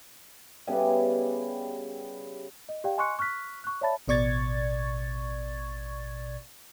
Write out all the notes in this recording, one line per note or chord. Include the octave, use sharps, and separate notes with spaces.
C#3 G3 B3 E4
D#5
G4 D5 F5 G5
D#5 G#5 C6 C#6 F#6 C#7
C#6 F6 F#6 B6
C#6 F#6
C#5 D5 E5 A5 B5 A6
A1 B2 D5 C#6 G#6 A6